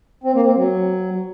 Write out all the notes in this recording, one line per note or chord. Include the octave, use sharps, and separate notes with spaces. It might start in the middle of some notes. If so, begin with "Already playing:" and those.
C4
A#3
C4
F#3